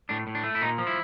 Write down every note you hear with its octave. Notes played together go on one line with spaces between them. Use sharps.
A2 D4
A2
D4
A3
E4
A#2 D#4
F3
E4